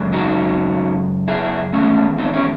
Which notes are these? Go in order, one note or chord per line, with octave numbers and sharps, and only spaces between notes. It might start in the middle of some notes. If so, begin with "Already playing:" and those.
Already playing: F#2 C#3 G#3
D#4 F#4
E4 G#4
E2 D#3 G#3 A3 C#4
C4 D#4
C#4 E4